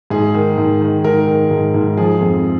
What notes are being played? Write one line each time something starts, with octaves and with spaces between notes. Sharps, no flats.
G#2 G#4
D#3
G#2
D#3
G#2 A#4
D#3
G#2
G#2
F3 G#4
F2